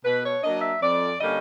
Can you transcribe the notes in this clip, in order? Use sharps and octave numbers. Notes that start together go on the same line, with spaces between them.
B2 B4
C#5
F#3 A#3 D4 D#5
E5
F2 D5
D3 G3 A#3 C#4 D#5